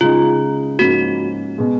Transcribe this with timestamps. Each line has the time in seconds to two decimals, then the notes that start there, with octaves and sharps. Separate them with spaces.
0.01 C#3 G#3 D#4 F4
0.79 G#2 F3 A#3 C#4 F#4
1.58 B2 G#3